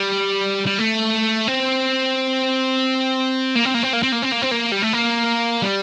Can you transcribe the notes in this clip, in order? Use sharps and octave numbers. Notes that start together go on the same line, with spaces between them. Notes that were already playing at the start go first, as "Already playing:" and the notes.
Already playing: G3
G3
A3
C4
A#3
C4
A#3
C4
A#3
C4
A#3
C4
A#3
C4
A#3
G3
A3
A#3
G3